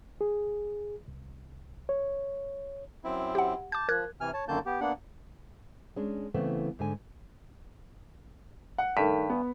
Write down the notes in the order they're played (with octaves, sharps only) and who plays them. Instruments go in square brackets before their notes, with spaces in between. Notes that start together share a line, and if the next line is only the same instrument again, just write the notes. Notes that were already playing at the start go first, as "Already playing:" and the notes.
[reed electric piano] G#4
C2
C#5
[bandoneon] F#2 C4 E4
[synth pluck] G4 F#5
[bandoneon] A5 [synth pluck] D6 G6
[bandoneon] F3 [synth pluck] A#4 F#6 G#6
[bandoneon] C3 E3 G#5 F6
C#5 A5
F#2 D3 D#3 A#3 A5 G6
B3 G4
A#3 B3 D4 F#5
[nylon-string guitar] G#3 C#4 D4
C#3 E3 A3 B3 C4
G#2 D3 G#5
[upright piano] F#5
[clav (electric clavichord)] G2 [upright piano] D#3 A3 B6
[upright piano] B3